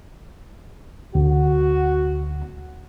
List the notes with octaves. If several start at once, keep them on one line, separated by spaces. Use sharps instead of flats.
D2 F#4